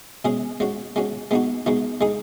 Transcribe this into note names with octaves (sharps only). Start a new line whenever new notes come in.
B2 G#3 C#4 G#4
G#3 C#4 F#4
G#3 C#4 F#4
G#3 B3 D#4 F#4
G#3 B3 D#4 F#4
G#3 D#4 G#4